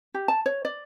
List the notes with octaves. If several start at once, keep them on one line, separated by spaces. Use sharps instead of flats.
G4
A5
C#5
D5